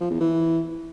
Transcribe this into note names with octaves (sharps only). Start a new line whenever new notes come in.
F3
E2
E3